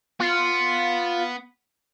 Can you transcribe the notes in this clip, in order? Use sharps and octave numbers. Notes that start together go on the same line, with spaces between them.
B3 F4